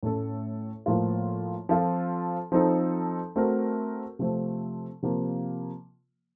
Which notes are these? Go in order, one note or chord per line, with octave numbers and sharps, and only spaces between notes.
A2 A3 C#4 A4
A2 F3 A#3 F4
F3 C4 F4 A4
F3 C4 D#4 A4
A3 C4 F#4 A#4
C3 F3 A3 C4
C3 F3 A#3